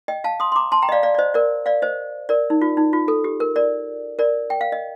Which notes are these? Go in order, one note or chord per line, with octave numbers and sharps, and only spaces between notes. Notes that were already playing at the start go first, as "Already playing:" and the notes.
D#5 G5
F5 A5
C6 D#6
C6
A#5 D6
A5 C6
G5 A#5
D#5
D5 F5
D5 F5
D5
C5 D#5
A#4 D5
D5 F5
C5 D#5
A#4 D5
D#4
F4
D#4
F4
A4
G4
A#4
A#4 D5
A#4 D5
G5
F5
D#5